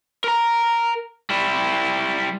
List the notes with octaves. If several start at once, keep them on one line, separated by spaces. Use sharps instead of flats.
A#4 A#5
G3 E4